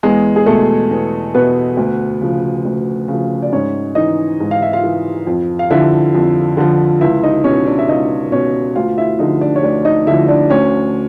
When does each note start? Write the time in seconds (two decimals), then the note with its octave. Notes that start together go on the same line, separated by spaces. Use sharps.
0.03 E2 G#3 G#4
0.36 G#4
0.46 B2 A3 A4
0.91 E2
1.34 B2 B3 B4
1.77 D2
2.21 C#3 F3
2.65 D2
3.08 C#3 F3
3.42 D5
3.52 G#2 C#4 C#5
3.95 E3 D#4 D#5
4.40 G#2
4.51 F5
4.62 E5
4.73 F4 F5
4.83 E3
5.27 F2
5.59 F5
5.70 D3 F3 E4 E5
6.15 F2
6.57 D3 F3
7.01 C#2 E4 E5
7.23 D#4 D#5
7.44 B2 C#4 C#5
7.66 D4 D5
7.79 E5
7.88 C#2 D#4 D#5
8.32 B2 C#4 C#5
8.76 D2 F4 F5
8.97 E4 E5
9.19 D3 F3 D#4 D#5
9.41 D4 D5
9.56 C#5
9.63 D2 D4 D5
9.85 D#4 D#5
10.06 D3 F3 E4 E5
10.28 D4 D5
10.50 D2 C#4 C#5